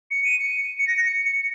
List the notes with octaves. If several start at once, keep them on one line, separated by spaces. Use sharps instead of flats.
C#7
D#7
C#7
C#7
A#6
C#7
C#7